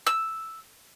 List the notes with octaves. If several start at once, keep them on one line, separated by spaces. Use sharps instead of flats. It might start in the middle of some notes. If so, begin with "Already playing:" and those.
E6